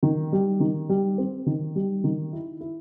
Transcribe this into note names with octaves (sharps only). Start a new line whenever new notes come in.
D#3
G3
D#3
G3
C4
D#3
G3
D#3
E4
E4